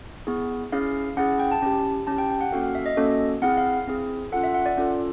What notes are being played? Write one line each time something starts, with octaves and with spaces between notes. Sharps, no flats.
B3 E4 G#4
C#4 E4 G#4 F5
C#4 E4 G#4 F#5
G5
A5
C#4 E4 G4
C#4 E4 G4 A5
G5
G5
F#5
A#3 C#4 F#4 A4 F5
F5
E5
D#5
A#3 C#4 F#4 A4
C4 E4 G#4 F#5
F5
C4 E4 G#4
C#4 F4 A4 F#5
E5
F#5
D5
C#4 F4 A4